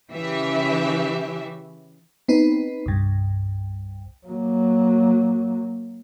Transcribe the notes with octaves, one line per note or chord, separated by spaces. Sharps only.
C#3 E3 G4 E5
B3 C4 D#4 B4
C2 G2
F#3 A#3